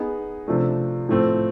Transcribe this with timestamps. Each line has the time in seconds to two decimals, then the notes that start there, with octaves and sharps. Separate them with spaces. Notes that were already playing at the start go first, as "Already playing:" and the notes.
Already playing: B3 D#4 G#4
0.47 C3 F3 A3 D4
1.09 A2 F3 A3 C4